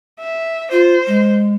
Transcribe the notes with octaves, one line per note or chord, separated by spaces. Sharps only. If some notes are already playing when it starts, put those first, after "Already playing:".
E5
F4 C5
G#3